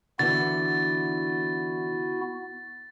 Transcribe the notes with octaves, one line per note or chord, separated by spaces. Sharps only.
D3 E3 B3 E4 F#4 A6